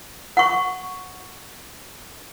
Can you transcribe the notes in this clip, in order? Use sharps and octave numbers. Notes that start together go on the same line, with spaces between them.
F#5 C#6